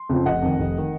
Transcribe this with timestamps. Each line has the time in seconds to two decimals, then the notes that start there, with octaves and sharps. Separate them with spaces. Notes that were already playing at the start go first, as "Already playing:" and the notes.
Already playing: C6
0.09 F2 C#3 F3 C4
0.26 F1 D#5 F#5
0.42 F2 D#3
0.59 F1
0.78 D#3